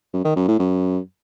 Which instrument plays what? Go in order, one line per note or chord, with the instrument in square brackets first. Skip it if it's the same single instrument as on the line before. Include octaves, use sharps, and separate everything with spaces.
[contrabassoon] F#2
D#3
F#2
A2
F#2